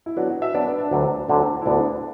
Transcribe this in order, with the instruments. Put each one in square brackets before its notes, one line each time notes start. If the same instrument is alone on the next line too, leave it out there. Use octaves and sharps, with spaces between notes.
[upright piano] E4
[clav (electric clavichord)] F#3 B3 D4 [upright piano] F#4
[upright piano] F#4
E5
[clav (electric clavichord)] F#3 B3 D4 [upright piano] D5
[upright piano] B4
D4
[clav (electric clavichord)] D2 D3 F#3
D2 D3 F#3
[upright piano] E4
[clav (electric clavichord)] D2 D3 B3 [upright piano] D4